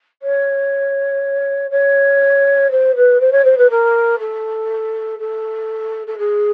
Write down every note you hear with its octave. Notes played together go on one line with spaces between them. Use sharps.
C#5
C#5
C5
B4
C5
C#5
C5
B4
A#4
A4
A4
A4
G#4